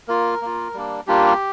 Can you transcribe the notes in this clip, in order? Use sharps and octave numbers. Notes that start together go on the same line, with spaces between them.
A#3 F4 A#4
A#3 F4
G3 A#3 D4
G3 A#3 D4 F4 G4